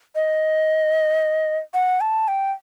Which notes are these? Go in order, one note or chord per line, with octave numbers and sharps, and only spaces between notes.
D#5
F#5
A5
G5